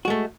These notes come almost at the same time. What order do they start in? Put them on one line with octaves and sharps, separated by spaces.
F#4 G#3 A3